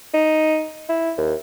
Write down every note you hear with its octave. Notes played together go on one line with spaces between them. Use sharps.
D#4
E4
D#2